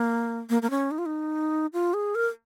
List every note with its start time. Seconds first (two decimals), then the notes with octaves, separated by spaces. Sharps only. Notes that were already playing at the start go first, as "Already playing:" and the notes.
Already playing: A#3
0.50 A#3
0.62 A#3
0.70 C#4
0.91 D#4
0.98 F4
1.06 D#4
1.73 F4
1.94 G#4
2.15 A#4